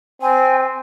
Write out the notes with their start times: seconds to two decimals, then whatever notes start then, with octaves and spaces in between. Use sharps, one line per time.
0.21 C4 G#5